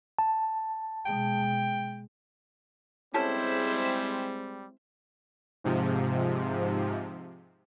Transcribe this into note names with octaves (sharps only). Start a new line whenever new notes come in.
A5
B2 G#3 G5
G3 G#3 C4 C#4 E4 G4 A4 C5
G#2 C3 F3